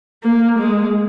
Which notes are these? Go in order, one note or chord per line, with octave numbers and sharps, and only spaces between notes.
A#3
G#3